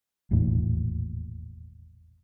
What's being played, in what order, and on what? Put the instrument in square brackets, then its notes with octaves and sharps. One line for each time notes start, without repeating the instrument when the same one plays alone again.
[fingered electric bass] E1 A1 D#2 A#2